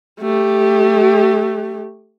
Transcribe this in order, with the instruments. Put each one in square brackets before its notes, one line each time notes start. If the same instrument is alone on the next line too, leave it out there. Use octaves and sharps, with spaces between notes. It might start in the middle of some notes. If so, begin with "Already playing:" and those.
[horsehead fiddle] A3 G4